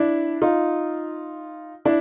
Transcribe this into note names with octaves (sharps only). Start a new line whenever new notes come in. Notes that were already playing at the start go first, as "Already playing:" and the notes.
Already playing: D4 E4
D#4 F4
D4 E4